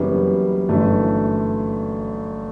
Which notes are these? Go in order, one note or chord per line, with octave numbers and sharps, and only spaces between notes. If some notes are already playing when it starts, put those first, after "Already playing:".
Already playing: F#1 F#2 E3 G3 B3
G1 F#2 E3 A3